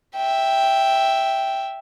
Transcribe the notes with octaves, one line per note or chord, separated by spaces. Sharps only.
E5 G5